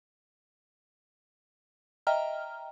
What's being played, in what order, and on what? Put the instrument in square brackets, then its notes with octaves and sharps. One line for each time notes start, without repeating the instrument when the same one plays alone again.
[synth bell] D#5 E5 G5 A#5 F6